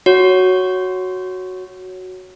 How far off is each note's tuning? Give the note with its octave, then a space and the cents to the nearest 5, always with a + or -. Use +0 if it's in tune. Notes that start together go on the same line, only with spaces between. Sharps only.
F#4 +0 C#5 +0